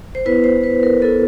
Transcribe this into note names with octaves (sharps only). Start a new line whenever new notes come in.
C5
B3 E4 B4
C5
B4
A#4
B3 E4 A4